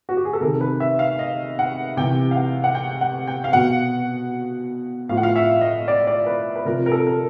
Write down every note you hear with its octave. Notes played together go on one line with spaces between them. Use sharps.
F#4
G4
G#4
A4
C3 D#3 A#4
B4
E5
F5
D#5
F#5
C3 E3 G5
F5
F#5
F#5
G5
F#5
G5
F5
B2 F#5
A2 F3 F5
F#5
F5
E5
D#5
D5
D5
B4
B4
C3 F3 A#4
A#4
A4
A#4